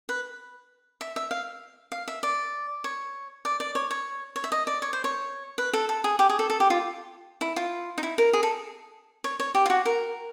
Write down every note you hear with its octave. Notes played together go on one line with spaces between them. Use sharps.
B4
E5
E5
F5
F5
E5
D5
C#5
D5
D5
C#5
C#5
C#5
E5
D#5
D5
C#5
C5
C#5
B4
A4
A4
G#4
G4
G#4
A4
A4
G4
F4
E4
F4
D#4
E4
A#4
G#4
A4
C#5
C#5
G4
F4
F#4
A#4